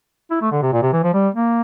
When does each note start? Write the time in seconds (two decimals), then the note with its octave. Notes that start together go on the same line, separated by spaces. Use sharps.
0.31 E4
0.42 A3
0.52 D3
0.62 C3
0.73 A#2
0.82 C3
0.93 E3
1.04 F3
1.14 G3
1.34 A#3